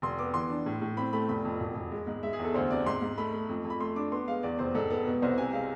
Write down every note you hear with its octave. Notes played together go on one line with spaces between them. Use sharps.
F1 C6
B3 D6
E3 C6
D4
A2
A2
C4 B5
A3 B5
F1 B5
F2
E1
E1
G#3
G#2
G#3 E5
G#4
E2 A4
D2 C5
C3 D5
G#2 C6
G#2
A3 B5
A3
F2
F2
B5
A3 C6
D4 D6
B3 C6
G#3 F5
E2 D5
F1 C5
G#2 A4
B3 A4
B2
C2 C5
C3 G#5
G#3 F5